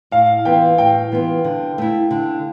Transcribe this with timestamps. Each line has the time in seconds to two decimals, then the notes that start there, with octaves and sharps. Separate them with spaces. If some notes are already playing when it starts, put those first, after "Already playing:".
0.11 A2 F5
0.45 E3 B3 F4 G5
0.78 A2 G5
1.12 E3 B3 F4
1.44 D3
1.78 A3 E4
2.11 D3